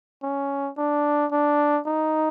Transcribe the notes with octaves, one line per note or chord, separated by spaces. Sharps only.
C#4
D4
D4
D#4